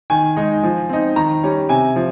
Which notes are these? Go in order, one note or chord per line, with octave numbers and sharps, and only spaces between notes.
D#3 G#5
G#3 D#4
F3
C4 D#4
D#3 A#5
G3 C#4
C3 G#5
F3